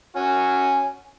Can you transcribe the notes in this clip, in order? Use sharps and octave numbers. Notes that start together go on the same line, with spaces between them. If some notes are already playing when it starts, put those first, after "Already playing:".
C#4 F#4